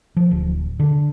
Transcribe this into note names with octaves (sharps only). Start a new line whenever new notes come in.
F3
D1
D3